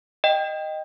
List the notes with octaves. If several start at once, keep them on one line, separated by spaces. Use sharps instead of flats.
D#5 G5